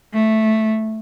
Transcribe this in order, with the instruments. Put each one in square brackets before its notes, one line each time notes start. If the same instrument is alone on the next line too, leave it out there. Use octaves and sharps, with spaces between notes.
[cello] A3